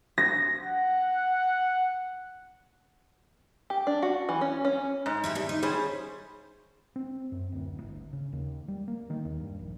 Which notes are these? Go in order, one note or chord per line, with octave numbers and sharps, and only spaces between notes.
A#6
F#5
G4
D4
F#4
E3
C#4
C#4
G#2
D#4 E4 G4
B2 G3
D#4
G3 C#4 G#4 C5
C4
F#2
D1
G1
C#3
D#2
G3
A#3
D#3
D#2
G2
A#1